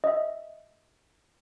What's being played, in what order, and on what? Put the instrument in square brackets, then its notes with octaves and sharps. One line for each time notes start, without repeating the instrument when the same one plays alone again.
[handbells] D#5 E5